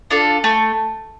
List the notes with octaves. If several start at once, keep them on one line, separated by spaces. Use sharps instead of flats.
D4 F4 A4
A3